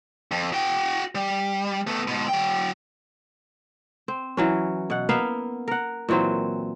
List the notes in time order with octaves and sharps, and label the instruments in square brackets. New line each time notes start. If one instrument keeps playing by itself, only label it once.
[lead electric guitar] F2
F#4 G5
G3
A3 B3
G#2 B2
F#3 G5
[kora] C4
E3 F#3 C#4
B2 F#5
A#3 B3 E5 F5
A#4 F#5
A#2 E3 F#3 C4